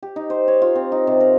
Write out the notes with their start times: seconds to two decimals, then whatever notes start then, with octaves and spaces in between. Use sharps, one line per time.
0.03 G4
0.16 D#4
0.30 C5
0.48 C#5
0.62 F4
0.75 C4
0.92 D#4
1.07 C3
1.20 A#4